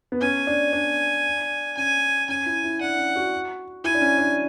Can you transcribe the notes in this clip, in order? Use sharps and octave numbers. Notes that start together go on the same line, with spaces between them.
B3
C#4 G#5
D4
D4
C#4 G#5
C#4 G#5
E4
E4
D4 F#5
C#4
F#4
E4 G#5
D4
C#4
D4